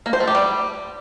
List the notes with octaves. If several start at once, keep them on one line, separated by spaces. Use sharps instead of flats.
A#3
C5
A3
G4
G3